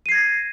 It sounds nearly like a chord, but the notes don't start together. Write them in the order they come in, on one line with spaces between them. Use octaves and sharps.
D#7 C7 G#6 A#6